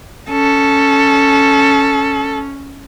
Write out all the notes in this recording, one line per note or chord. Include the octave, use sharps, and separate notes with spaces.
C#4 A4